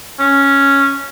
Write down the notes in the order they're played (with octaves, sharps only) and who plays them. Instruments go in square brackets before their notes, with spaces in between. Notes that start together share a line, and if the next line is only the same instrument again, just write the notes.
[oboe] C#4